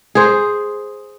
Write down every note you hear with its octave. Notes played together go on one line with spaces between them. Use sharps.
G#4 C5